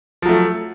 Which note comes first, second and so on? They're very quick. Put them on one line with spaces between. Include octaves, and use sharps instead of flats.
F3 F#3 A3